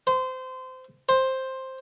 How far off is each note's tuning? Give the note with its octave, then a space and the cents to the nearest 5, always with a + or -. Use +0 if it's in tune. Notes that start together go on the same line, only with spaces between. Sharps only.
C5 -25
C5 +5